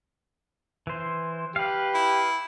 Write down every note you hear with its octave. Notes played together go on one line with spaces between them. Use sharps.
E3 C5
G4 B4 F5
E4